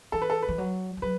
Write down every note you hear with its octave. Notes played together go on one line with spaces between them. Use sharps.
E3 A4
B4
A4
B4
E3
F#3
E3
F#3 B4